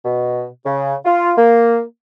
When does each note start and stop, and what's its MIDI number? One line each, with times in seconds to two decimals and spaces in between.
0.04 0.45 47
0.65 0.94 49
1.05 1.32 65
1.37 1.81 58